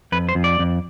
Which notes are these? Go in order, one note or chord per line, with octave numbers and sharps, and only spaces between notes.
F2 B4
C5
F2
D5
F2